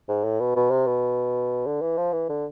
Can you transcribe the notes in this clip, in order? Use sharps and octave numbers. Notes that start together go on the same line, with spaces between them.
G#2
A2
B2
B2
C3
B2
D3
E3
F3
E3
D3